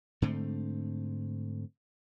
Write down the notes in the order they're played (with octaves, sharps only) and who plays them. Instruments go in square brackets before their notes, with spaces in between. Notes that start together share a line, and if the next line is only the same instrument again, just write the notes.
[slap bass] G#2 D3 A3 C4